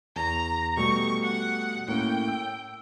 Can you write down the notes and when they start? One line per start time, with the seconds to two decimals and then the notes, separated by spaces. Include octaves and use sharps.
0.16 E2 A#5
0.77 B2 G3 A3 C#6
1.23 F#5
1.88 A2 A#3 C#4 G5
2.28 E6